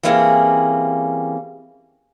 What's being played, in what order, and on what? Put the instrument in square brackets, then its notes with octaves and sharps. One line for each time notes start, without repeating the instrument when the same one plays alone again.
[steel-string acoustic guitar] E3 G3 A#3 C4 C#4 G#4